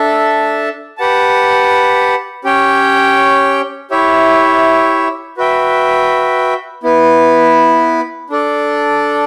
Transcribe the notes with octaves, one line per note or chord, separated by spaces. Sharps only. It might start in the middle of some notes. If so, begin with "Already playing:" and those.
Already playing: D4 A4 E5 A5
G4 B4 F#5 A5
C#4 G4 C#5 G5
E4 G4 C#5 E5
F#4 B4 E5 G5
B3 E4 B4
D4 A4 D5